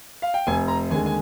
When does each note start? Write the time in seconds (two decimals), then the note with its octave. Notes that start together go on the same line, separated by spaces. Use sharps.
0.22 F5
0.34 G5
0.47 F1 G#5
0.68 A#5
0.90 D#2 D3 G#3 G#5
1.06 G#5